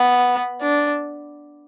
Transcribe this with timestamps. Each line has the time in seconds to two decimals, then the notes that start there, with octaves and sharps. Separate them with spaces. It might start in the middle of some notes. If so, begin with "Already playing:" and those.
Already playing: B3
0.61 D4